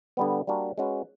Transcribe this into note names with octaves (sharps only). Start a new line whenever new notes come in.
D3 G3 B3
G3 A#3 D4 F#4 A#4
G#3 C#4 F#4 B4